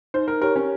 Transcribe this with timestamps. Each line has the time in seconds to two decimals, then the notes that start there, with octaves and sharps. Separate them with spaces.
0.14 D#4 C5
0.28 A#4
0.42 G4 A#4 C#5
0.56 C#4